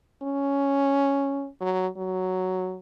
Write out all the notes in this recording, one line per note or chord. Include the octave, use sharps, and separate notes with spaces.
C#4
F#3
F#3